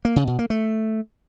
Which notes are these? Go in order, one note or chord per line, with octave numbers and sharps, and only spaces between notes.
A#3
C#3
B2
A#3
A3